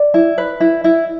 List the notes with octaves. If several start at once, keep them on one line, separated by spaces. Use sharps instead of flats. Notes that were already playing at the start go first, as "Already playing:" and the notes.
Already playing: D5
E4
B4
E4
E4